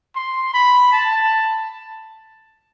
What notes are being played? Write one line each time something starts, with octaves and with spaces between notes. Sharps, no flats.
C6
B5
A5